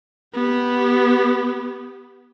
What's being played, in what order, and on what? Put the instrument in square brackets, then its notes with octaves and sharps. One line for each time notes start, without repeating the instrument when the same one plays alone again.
[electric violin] B3 G4